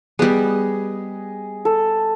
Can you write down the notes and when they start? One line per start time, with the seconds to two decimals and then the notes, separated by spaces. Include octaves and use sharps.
0.19 G3 B3 G#4 D#5
1.65 A4